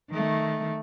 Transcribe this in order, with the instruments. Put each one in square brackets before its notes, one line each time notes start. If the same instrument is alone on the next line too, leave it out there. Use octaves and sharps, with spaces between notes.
[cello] D#3 A3